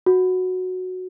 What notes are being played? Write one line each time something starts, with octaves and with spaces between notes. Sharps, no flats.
F#4